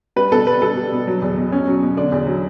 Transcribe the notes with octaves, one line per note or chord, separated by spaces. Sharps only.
G3 B4
B2 A4
G3 B4
G3 A4
G3
B2
F#3
E2
B2
B2 C#4
F#3
B2
D3 D4
E2
F#3